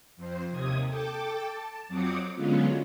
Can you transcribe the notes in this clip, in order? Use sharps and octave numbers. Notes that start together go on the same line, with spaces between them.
F2 C5
D#2 C3 D#6 G#6
A4 G5 A5 D6
A5
F2 F#3 C4 D6 D#6 C#7
D3 F#3 G#3 B3 C#4 F4